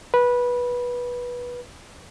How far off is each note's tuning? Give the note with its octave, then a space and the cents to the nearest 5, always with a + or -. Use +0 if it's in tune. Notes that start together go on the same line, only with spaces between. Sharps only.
B4 -15